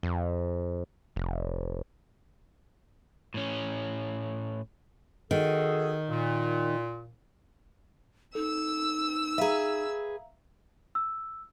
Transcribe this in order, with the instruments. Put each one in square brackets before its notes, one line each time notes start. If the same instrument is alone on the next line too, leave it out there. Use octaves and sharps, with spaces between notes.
[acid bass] F2
F1
[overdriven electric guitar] A2 C#4
[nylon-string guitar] D#3 [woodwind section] F#4 G#4 A4
[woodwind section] A#2
[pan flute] D#4 [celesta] A4 [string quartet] E6
[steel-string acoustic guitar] G#4 B4 [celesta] E5 F5 A#5
[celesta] E6